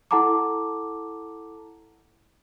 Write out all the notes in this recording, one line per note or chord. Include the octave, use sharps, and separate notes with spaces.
E4 A4 F#5 A5 A#5 D6